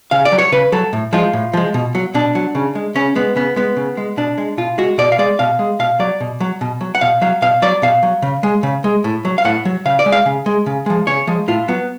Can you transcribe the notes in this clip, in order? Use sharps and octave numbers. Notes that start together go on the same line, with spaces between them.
C#3 F5
D5
F#3
C#5
C#3 B4
F#3 A4
A2
F3 G#3 F4
A2
F3 G#3
B2
F#3
B2 D4
F#3
C#3
G#3
C#3 C#4
G#3 B3
C#3 B3
G#3 B3
C#3
G#3
B2 D4
G#3
B2 F4
G#3 F#4
B2 D5
F5
G#3 D5
B2 F5
G#3
B2 F5
F#3 D5
B2
F#3
B2
F#3
F#5
B2 F5
F#3 F5
B2 F5
F#3 D5
B2 F5
F#3
C#3
G#3
C#3
G#3
A2
F#3
F5
A2 F#5
F#3
C#3 F5
D5
G#3
F5
C#3
G#3
C#3
F3 G#3
C#3 C#5
F3 G#3
A2 F4
F#3 B3